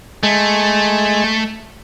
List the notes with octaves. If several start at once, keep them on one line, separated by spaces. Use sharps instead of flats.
G#3 A3